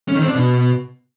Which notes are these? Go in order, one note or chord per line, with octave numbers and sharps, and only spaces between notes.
C#4
D#3
C4
D4
B2